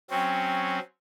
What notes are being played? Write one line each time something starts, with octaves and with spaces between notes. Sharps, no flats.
F#3 C4 C#4 G5